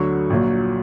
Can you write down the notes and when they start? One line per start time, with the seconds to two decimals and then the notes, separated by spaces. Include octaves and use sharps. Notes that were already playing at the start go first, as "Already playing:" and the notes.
Already playing: D2 D3 F#3 C#6
0.30 A#1 A#2 F#3